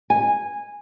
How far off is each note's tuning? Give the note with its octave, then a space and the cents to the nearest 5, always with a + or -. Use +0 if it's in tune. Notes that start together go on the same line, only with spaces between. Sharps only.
G#5 -15